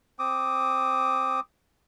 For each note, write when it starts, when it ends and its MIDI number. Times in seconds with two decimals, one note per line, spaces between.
0.19 1.40 60
0.19 1.40 86
0.19 1.40 87